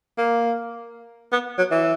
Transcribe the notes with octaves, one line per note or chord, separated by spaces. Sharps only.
A#3
B3
F#3
E3